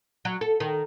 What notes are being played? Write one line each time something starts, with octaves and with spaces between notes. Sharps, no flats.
F#3
A4
D#3